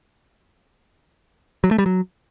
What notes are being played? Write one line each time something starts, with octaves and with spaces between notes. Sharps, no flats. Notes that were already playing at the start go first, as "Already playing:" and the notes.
F#3
A3
G3
F#3